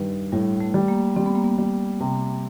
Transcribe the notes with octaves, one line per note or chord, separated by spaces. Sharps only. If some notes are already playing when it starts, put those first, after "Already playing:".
Already playing: G2 D#3
A2 G3
A3
G3
A#3
G3 C4
B3
A#3
B3
G3
C3